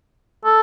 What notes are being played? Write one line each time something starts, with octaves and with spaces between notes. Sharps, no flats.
A4